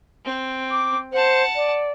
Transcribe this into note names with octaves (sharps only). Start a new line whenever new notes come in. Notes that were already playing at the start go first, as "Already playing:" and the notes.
C4
D6
C5 F#5 A5
D5